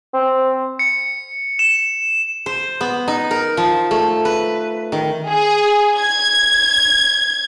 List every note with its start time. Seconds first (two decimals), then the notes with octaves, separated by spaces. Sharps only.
0.14 C4
0.79 C#7
1.59 E7
2.46 C5
2.81 B3
3.08 D#4
3.31 A#4
3.57 F3
3.91 A3
4.25 B4
4.92 D#3
5.27 G#4
5.97 G#6